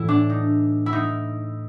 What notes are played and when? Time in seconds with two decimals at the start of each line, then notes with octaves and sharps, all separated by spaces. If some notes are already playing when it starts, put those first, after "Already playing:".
Already playing: A2 E3 E4
0.09 D4
0.30 D#4
0.86 E4
0.93 D#4